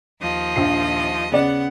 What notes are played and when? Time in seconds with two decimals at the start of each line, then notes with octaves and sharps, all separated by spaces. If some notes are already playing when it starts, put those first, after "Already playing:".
0.21 D#2 F3 D#5
0.56 A#1 C7
1.32 C#3 B3 D5 F#5